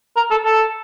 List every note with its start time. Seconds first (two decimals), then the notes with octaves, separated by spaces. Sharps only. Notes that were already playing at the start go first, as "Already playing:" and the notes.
0.16 A#4
0.31 A4
0.45 A4